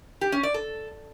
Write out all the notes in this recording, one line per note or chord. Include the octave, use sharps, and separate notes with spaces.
G4
C#4
D5
A4